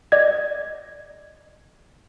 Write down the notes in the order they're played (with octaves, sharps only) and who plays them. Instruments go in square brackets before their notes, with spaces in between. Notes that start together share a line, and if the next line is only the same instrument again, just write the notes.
[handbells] D5 D#5 G#6